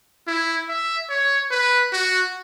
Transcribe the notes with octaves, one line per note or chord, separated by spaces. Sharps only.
E4
E5
C#5
B4
F#4